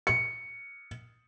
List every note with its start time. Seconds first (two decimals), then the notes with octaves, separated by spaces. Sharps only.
0.07 C#7